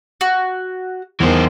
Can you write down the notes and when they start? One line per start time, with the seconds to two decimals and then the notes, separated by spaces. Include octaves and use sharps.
0.21 F#4
1.20 E2 D#3 E3 C5